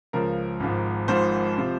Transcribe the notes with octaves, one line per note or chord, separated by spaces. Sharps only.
C#2 C#3 F3 A#4
G#1 G#2 F3
G#1 G#2 F3 C5
C3 F3